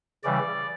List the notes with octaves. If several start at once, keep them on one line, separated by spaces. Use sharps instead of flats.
C#3 E3 G3 D5